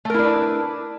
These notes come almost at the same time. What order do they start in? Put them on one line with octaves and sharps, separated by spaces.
A3 A#4 E4 D4 B4